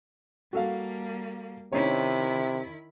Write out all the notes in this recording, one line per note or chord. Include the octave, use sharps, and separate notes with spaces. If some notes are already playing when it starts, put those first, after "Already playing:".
G3 A#3 F#4 A4 F5
C3 D#3 C#4 D#4 E4 C#5